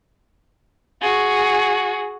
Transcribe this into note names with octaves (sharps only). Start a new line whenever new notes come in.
F#4 G#4